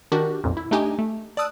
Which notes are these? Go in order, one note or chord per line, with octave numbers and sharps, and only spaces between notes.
D#3 D4 F#4 G4 A#4
B1 F2 A#2
E4
A3 D4 D#4 G4 D#5 G#5
A3
D5 A5 D#6 E6 F#6